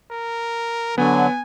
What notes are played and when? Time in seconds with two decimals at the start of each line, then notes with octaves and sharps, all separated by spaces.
0.11 A#4
0.98 D3 F#3 B3 G#5